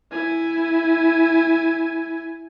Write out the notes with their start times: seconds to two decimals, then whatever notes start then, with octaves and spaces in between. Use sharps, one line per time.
0.12 E4 G#5